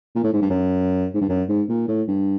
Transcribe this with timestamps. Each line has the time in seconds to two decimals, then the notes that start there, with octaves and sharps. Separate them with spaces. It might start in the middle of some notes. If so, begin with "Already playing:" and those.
0.15 A#2
0.24 A2
0.33 G#2
0.42 G2
0.50 F#2
1.14 G#2
1.21 G2
1.29 F#2
1.49 G#2
1.69 A#2
1.88 A2
2.08 G2